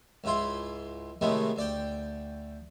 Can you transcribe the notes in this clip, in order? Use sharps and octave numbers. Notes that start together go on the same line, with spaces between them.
C#2 G#2 E4 F4 C6
A2 C3 D#3 G#3 A3 B3
D2 D5 G5